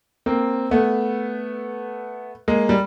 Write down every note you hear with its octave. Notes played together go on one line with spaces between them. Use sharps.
A#3 C4
A3 B3
G#3 A#3
G3